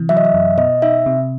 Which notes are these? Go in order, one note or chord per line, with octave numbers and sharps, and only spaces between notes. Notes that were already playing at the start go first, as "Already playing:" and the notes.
Already playing: C3 E3
F#3 E5
D#5
E5
F#2
B2 D#5
D#4 E5
C3